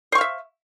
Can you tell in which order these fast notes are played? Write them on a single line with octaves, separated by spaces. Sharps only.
C5 C#6 F5 E5